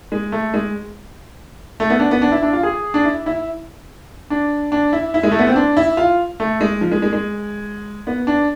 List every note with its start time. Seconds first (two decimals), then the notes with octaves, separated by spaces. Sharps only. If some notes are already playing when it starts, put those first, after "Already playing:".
0.12 G#3
0.32 A3
0.54 G#3
1.80 A3
1.90 B3
2.00 D4
2.11 B3
2.22 D4
2.32 E4
2.43 D4
2.53 F4
2.63 G#4
2.94 D4
3.05 E4
3.26 E4
4.30 D4
4.72 D4
4.93 E4
5.14 E4
5.23 G#3
5.32 A3
5.39 B3
5.47 C4
5.56 D4
5.77 E4
5.97 F4
6.40 A3
6.61 G#3
6.81 F3
6.91 G#3
7.02 G#3
7.13 G#3
8.07 B3
8.27 D4